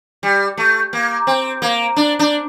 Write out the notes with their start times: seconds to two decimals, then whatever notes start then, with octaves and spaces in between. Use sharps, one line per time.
0.23 G3
0.57 A3
0.93 A#3
1.27 C4
1.62 A#3
1.96 D4
2.19 D4